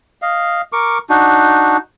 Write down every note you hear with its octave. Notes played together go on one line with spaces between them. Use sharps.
D#5 F5
A#4 C#6 D6
D4 D#4 F#4